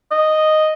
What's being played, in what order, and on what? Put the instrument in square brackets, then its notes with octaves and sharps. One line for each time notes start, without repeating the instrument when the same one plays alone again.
[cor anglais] D#5